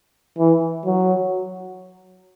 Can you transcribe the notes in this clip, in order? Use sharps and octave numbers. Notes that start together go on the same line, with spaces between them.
E3
F#3